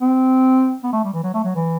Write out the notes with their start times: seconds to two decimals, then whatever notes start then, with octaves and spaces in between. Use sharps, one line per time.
0.01 C4
0.84 B3
0.93 A3
1.04 G3
1.13 E3
1.24 F#3
1.34 A3
1.44 F#3
1.55 E3